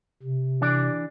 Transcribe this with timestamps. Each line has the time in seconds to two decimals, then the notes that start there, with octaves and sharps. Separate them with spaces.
0.22 C3
0.61 E3 D4 D5